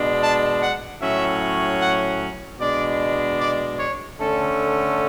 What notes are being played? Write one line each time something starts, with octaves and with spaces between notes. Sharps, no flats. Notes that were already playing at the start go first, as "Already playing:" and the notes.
Already playing: B2 G#3 D4
A5
F#5
A2 F#3 C#4 E5
F#5
B2 G#3 D4 D5
D5
C#5
D3 A3 C#4 A4